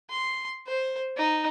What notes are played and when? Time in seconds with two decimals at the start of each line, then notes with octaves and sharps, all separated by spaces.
0.10 C6
0.67 C5
1.17 D#4